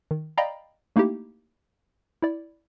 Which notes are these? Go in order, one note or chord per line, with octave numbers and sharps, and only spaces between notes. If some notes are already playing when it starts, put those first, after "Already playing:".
D#3
D5 D#5 F5 G5 A#5 B5
A3 A#3 D#4 E4 G4
E4 D5